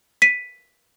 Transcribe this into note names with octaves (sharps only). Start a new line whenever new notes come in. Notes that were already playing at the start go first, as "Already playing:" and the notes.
B6 D#7